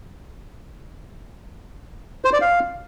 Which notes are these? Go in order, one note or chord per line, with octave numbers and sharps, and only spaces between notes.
C5
D5
F5